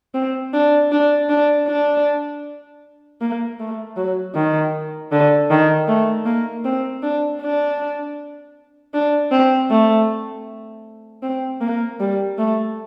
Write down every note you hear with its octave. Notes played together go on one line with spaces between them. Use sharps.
C4
D4
D4
D4
D4
A#3
A3
F#3
D#3
D3
D#3
A3
A#3
C4
D4
D4
D4
C4
A3
C4
A#3
G3
A3